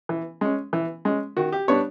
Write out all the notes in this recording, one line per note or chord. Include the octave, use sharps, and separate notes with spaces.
E3
G#3 C#4
E3
G#3 C#4
D#3 F#4
G4
G3 B3 D4 C#5